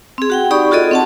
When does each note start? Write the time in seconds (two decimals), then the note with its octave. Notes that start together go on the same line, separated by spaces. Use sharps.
0.18 C4 G#4
0.30 F#4 F#5 G5
0.51 D#4 G4 D5 B5 C#6 D#6
0.71 F4 F#4 G#4 A4 D5 D#5
0.91 C4 F#5 A5